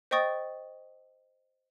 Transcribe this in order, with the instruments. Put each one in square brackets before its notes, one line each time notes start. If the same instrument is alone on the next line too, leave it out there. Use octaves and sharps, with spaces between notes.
[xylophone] C5 D#5 G5 C#6 D#6 A6